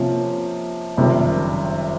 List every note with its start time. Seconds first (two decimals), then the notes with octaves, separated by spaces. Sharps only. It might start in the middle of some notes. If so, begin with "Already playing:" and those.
Already playing: C3 F3 A#3 C#4
0.97 F#1 F2 C3 D#3 G3